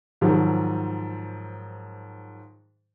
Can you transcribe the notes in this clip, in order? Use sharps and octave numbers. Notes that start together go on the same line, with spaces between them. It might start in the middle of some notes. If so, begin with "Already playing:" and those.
G#2 D#3 F3 F#3